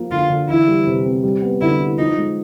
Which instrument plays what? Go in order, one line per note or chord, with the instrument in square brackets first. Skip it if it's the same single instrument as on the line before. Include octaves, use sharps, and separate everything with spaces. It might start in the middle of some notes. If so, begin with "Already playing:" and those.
Already playing: [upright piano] F3 A#3
[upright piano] D3 [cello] F4
[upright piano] D3
[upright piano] E3 [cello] E4
[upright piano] G3
C3
C4
G3
B3
[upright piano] D3 [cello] E4
[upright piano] E4
[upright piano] F3 [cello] D#4
[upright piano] G#3